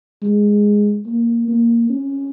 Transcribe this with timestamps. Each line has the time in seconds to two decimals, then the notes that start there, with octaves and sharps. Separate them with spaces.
0.22 G#3
1.06 A#3
1.48 A#3
1.90 C#4